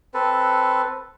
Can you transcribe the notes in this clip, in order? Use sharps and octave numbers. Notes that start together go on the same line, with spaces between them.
C4 A4 B4